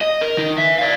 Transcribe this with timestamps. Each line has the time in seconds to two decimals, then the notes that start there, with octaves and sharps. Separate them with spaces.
0.01 D#5
0.21 A#4
0.37 D#3 D#4
0.58 B4 E5
0.79 D5 F5